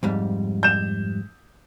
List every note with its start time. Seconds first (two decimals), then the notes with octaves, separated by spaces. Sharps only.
0.03 F2 G#2 G3
0.63 G6 E7